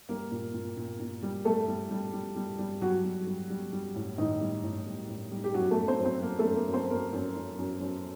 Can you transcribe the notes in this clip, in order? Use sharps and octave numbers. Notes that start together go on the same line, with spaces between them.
G3 A#3 A#4
A#2
A#2
A#2
A#2
G3
G3 A3 A4
G3
G3
G3
G3
G3
F#3 G3 F#4
G3
G3
G3
G3
A2
A2 D#3 D#4
G3
A2
G3
A2
G3
G4
F#2 F#3 F#4
A3 A4
F#3
C4 C5
F#2
C4 C5
F#3 A#3 A#4
A3 A4
F#2
A#3 A#4
F#2
C4 C5
F#2 A#3 A#4
F#2
F#2
F#2
F#2